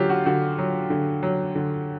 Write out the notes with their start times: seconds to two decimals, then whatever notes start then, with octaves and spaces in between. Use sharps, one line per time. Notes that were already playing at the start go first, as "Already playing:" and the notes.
Already playing: D3 F#3 F4 G4
0.09 F#4
0.26 D3 F#4
0.58 F#3
0.90 D3
1.23 F#3
1.55 D3